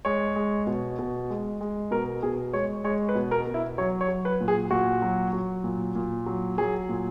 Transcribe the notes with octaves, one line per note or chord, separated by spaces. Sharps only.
G#3 C#5
G#3
B2
B2
G#3
G#3
B2 A#4
B2 G#4
G#3 C#5
G#3 C#5
B4
B2
A#4
B2
E4
F#3 C#5
C#5
F#3
B4
A#2
G#4
A#2 F#4
F#3
F#3
A#2
A#2
F#3
F#3 G#4
A#2